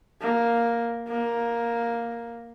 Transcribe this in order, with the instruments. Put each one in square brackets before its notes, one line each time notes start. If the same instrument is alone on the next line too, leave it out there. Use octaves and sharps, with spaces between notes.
[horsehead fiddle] A#3
A#3